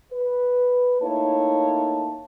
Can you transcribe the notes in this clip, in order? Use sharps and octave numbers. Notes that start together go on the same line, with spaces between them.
B4
A3 A#3 D#4 E4 C#5 A5